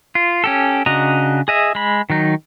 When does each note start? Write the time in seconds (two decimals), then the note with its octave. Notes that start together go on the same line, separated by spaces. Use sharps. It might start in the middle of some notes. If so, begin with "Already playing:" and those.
0.15 F4
0.44 C#4 G4 A4
0.86 C#3 D4 F#4 D#5 A#5
1.48 G#4 D#5 E5
1.75 G#3 B5
2.10 D#3 F#3 D#4